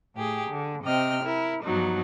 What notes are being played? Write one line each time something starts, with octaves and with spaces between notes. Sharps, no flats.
A2 G4 G#4
D3
C3 C4 D#5 G5 F6
E4 A#4
G2 F3 F#3 B3 D#4